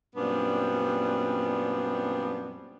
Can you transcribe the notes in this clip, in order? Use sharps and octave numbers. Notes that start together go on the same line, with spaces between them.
F#2 A#2 G3 B3 C4 D4